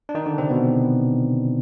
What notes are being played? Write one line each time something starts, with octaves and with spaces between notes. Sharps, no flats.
D4
D#3 D#4
D3 D4
C3 C4
B2 B3